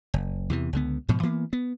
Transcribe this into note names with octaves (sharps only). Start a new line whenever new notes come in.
F#1
E2 C3 E3
C#2 D3 B3
G#2 B2 F3
E3 A#3 B3
B3